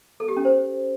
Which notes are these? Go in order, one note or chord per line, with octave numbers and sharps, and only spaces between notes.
A4
G4
C#4
C5